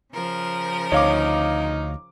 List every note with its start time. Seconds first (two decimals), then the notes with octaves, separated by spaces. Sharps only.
0.13 C#3 F3 A#4
0.92 D2 D#4 C#5 F5 D6